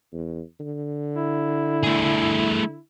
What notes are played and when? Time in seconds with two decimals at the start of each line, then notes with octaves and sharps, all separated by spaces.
0.13 E2
0.60 D3
1.16 E4
1.84 A3 G#4